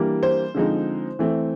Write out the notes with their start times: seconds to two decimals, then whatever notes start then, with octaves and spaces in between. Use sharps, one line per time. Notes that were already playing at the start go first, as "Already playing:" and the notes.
Already playing: E3 G3 A#3 D4
0.23 C5
0.55 D3 F3 G#3 C4 D#4
1.19 E3 A3 C4